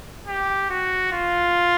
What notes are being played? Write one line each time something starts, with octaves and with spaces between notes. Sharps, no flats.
G4
F#4
F4